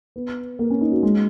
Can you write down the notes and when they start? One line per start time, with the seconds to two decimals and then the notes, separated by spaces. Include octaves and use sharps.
0.16 B3
0.59 A#3
0.70 C#4
0.81 D#4
0.92 F#4
1.03 G#3